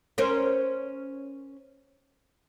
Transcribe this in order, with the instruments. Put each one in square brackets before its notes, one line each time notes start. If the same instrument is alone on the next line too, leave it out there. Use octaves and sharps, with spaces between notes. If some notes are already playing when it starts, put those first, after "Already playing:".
[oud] C#4 A#4 C5